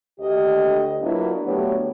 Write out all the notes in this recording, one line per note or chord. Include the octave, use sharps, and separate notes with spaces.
D2 G4 D#5
F#3 A#3 B3 D4 E4 F4
D3 F#3 A3 B3 G4 C#5